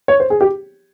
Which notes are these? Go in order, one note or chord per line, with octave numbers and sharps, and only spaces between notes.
C#5
C5
G#4
G4